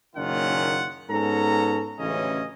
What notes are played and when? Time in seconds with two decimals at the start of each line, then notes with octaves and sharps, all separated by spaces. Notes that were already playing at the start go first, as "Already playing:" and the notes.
0.16 F#1 A#2 D#3 C#4 F4 F#5
1.10 G#2 B3 C#4 A4 A#5
1.99 A1 D2 C#3 E3 C#4 D#5